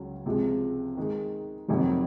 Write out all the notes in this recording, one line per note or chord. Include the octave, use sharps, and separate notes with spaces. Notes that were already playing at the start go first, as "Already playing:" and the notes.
Already playing: C#2 C#3 F#3
C#2 C3 F3 G#3
D#3 G#3 D#4
F2 C3 D#3 F#3